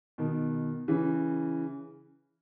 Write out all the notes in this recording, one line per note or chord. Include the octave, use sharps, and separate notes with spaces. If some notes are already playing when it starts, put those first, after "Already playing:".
B2 D#3
C#3 E3